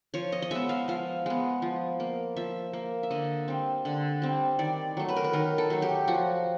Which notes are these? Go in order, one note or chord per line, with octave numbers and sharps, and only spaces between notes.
F3 C#5
D#5
D#5
G#3 B3 E5
F5
F3 F5
G#3 B3
F3
A#3
F3 E5
A#3
E5
D3 D#5
G3 C4
D3
G3 C4
D#3 D5
F#3 A3
B4
A#4
B4
D#3 A#4
A4
F#3 A3
G4
F3 F#4